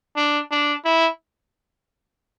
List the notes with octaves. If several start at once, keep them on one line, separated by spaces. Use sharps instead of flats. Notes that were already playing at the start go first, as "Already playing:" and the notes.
D4
D4
E4